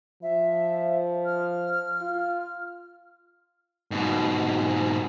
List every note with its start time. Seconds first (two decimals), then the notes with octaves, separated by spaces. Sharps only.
0.22 F3 E5
1.26 F6
2.01 F4
3.91 G#2 B2